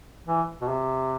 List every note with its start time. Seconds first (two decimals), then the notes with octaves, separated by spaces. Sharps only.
0.26 E3
0.61 B2
0.68 C3